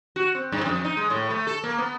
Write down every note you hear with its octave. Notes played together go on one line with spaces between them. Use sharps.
F#4
C4
G2
F2
D#4
G#3
A2
A3
A4
A#3
B3